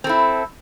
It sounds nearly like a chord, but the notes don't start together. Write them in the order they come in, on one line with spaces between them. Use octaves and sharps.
C4 A4 E4